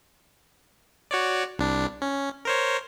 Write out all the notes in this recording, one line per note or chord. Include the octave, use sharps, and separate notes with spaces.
F#4 C#5 D5
C2 D4
C#4
A#4 C5 C#5